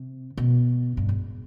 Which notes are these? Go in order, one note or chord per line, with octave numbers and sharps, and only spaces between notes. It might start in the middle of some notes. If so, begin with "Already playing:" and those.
Already playing: C3
B2
G2
G#2